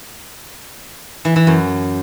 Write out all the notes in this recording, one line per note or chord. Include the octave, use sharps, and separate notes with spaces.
E3
E3
F#2